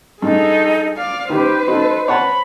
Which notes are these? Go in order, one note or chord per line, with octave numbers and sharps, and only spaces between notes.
G2 D#4 G#4 A4
D5 F5
D#3 G4 B4 C5
D#4 F#4 A4
C#5 F#5 A5 B5